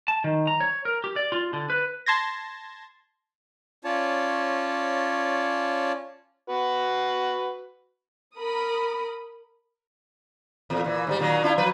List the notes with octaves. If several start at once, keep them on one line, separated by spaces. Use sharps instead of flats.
A5
D#3
A#5
C#5
A#4
G4
D5
F4
D3
B4
A5 C6 G#6 A#6
C#4 F4 C#5 D5 A5
F#4 B4
A#4 B5 D#6
E2 A#2
A#2 E3
G#2 D#3 G3
A#2 D#3 F#3
D4 E4 F4
F3 F#3 B4